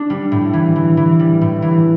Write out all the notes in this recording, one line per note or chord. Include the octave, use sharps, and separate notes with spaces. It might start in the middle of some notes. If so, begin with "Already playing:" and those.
Already playing: D4
G3
A2
E3
E3
E3
G3
A2
E3